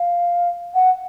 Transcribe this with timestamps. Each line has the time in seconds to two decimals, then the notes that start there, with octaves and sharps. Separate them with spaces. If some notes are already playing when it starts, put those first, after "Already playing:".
Already playing: F5
0.74 F#5